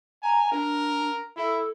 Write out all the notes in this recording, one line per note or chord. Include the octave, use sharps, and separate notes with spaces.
G#5 A#5
D4 A#4
E4 A4